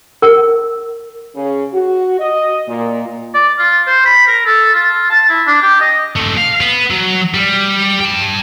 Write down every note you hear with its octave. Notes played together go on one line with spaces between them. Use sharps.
A#4
C#3
F#4
D#5
A#2
D5
F4
C5
B5
A#4
A4
F4
A5
E4
D4
G4
D#5
A3 C4
F5
B3
F#3
G3
G5 A5